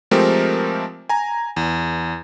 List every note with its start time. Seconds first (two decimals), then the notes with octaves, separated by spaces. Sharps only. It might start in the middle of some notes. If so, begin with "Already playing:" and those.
0.11 F3 G#3 A3 C4 G4 A#4
1.09 G#5 A#5
1.56 E2